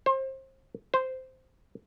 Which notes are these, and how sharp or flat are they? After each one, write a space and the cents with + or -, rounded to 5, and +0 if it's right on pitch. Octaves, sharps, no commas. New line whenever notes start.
C5 +30
C5 -10